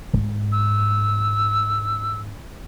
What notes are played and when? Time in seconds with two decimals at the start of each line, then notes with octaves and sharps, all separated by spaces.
0.14 G#2
0.52 E6